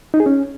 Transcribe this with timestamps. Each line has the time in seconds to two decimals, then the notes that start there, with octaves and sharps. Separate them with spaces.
0.14 D#4
0.20 G#4
0.26 C#4